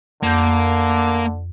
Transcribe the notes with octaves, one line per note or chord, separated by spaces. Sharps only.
F2 D3 A#3 G6